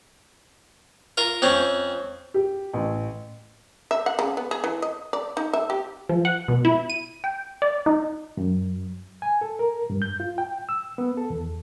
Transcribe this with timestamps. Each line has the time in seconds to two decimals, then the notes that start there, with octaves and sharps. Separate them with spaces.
1.17 F4 A#4
1.42 F2 C4 C#4
2.34 G4
2.74 A1
3.91 E5
4.06 F#5
4.19 C#3
4.37 B3
4.51 G#4
4.64 E3
4.82 D#5
5.13 D5
5.37 D#4
5.53 E5
5.70 G4
6.09 F3
6.25 F#5
6.48 B2
6.65 E4
6.90 D#7
7.24 G5
7.62 D5
7.86 D#4
8.37 F#2
9.22 G#5
9.41 A4
9.59 A#4
9.90 G2
10.02 G6
10.20 F4
10.38 G5
10.69 E6
10.98 B3
11.17 A4
11.30 E2